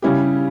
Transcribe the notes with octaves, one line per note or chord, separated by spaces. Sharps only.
C#3 G3 C#4 E4 G4